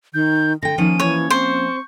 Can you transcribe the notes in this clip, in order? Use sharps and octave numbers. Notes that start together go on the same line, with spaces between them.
D#3 G6
D3 G5 A#6
D#3 F3 A#3 C#4 D#7
E3 C#5
C4 C5 C#6